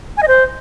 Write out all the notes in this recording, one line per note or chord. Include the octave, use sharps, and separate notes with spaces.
G#5
D#5
C5